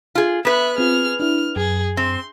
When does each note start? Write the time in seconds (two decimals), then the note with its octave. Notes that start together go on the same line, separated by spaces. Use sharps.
0.15 F4 G#4
0.45 B3 B4 E5 F#6
0.78 C4 F4 G#4 F6
1.20 D4 E4 F6
1.56 F#2 G#4
1.97 C4 C6